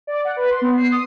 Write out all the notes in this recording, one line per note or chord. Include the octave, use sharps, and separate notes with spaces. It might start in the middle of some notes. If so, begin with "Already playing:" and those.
D5
F#5
B4
C6
B3
C7
D#6